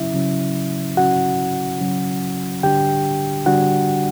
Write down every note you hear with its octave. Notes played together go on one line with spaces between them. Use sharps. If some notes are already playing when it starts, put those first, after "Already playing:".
Already playing: C#3 F#3 C#4 E4 E5
C#3 F#3 C#4
C#3 F#3 C#4 F#4 F#5
C#3 F#3 C#4
D3 G3 D4 G4 G5
D3 G3 D4 F#4 F#5